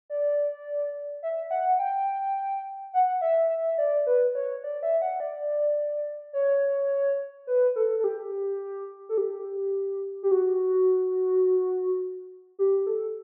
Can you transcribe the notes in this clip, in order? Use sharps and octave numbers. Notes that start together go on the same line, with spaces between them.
D5
E5
F#5
G5
F#5
E5
E5
D5
B4
C#5
D5
E5
F#5
D5
C#5
B4
A4
A4
G4
A4
G4
G4
F#4
G4
A4